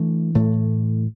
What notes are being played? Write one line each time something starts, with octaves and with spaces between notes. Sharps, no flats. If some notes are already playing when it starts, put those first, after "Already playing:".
Already playing: E3 A3 D4
A2 E3 A3